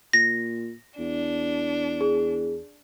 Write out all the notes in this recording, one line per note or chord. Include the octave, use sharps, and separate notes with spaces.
A#2 A#6
E2 D4
G#4